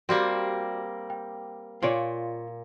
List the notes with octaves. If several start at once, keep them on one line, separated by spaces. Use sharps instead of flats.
G3 A#3 C4 F#4 G4 D5
G5
A#2 F4 C#5 D5